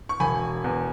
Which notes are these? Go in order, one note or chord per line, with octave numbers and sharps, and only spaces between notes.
C#6
E1 G#5 B5
E2